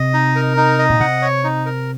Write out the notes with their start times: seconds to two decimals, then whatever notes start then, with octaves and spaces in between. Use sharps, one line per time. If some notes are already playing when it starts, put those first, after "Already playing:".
Already playing: C3 D#5
0.14 D#4
0.36 A#4
0.57 D#4
0.79 D#5
0.90 A#2
1.00 C3 F#5
1.22 C#5
1.44 D#4
1.66 A#4